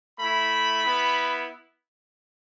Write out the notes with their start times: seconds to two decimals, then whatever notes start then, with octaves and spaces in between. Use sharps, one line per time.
0.19 A3 E4 B5
0.82 B3 E4